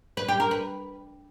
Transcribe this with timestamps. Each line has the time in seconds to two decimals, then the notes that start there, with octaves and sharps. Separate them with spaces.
0.17 B4
0.28 G4
0.40 A#4
0.51 B4